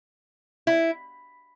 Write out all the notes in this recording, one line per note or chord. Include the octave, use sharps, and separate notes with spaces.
E4